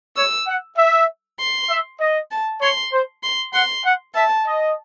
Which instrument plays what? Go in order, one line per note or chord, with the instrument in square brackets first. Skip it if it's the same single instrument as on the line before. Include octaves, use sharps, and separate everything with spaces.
[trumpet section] C#5 [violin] E6
[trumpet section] F#5
E5
[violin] C6
[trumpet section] E5
D#5
[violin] A5
[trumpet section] C#5 [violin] C6
[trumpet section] C5
[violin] C6
[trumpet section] F#5 [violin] C6
[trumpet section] F#5
[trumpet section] E5 [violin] A5
[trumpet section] D#5